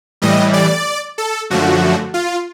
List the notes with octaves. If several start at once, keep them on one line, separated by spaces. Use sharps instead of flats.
A2 E3 G3 D#5
D5
A4
F#2 D3 F3 A3 F#4
F4